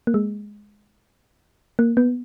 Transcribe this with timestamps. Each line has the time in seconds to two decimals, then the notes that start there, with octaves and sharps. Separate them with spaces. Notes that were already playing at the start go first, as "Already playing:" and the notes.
0.07 A#3
0.14 G#3
1.79 A#3
1.97 B3